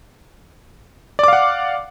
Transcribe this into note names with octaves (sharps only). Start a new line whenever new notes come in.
D5 F5 F#5 D6